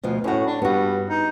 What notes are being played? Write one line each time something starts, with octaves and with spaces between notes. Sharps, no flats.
D2 B2 F3
A2 C#4 F#4
D4
G2 B3 F#4
D#4